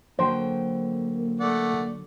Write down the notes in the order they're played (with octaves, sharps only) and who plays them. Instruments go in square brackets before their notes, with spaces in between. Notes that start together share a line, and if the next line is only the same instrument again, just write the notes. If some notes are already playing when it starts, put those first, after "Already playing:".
[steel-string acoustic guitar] D3 F#3 G5 [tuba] A#3 [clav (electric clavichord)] C5
[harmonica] A3 D5 F#5